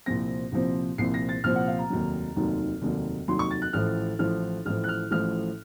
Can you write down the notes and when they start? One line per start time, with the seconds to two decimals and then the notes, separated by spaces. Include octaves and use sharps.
0.06 C2 A#2 F3 C4 A#6
0.52 C2 A#2 F3 C4
0.98 C2 A#2 F3 C4 C7
1.14 A#6
1.29 A6
1.44 C2 A#2 F3 C4 F6
1.56 F#5
1.67 F5
1.79 A#5
1.90 F1 D#2 D#3 F#3
2.36 F1 D#2 D#3 F#3
2.82 F1 D#2 D#3 F#3
3.28 F1 D#2 D#3 F#3 C6
3.39 C#6
3.51 A6
3.62 F#6
3.73 A1 A2 F3 F6
4.19 A1 A2 F3 F6
4.66 A1 A2 F3 F6
4.84 F#6
4.88 F6
5.11 A1 A2 F3 F6